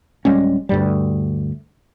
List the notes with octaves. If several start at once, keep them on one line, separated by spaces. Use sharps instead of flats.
D1 G3 G#3 C#4
D2 G2 G3